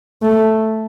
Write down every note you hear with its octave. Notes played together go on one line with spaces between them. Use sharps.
A3